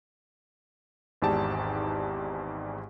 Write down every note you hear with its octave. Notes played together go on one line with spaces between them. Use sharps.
G#1 E2 G#2 G4 D5 A5